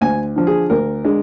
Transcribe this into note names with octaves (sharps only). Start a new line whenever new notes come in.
D2 G#5
D3 F3
G#4
D2 A#4
D3 G#3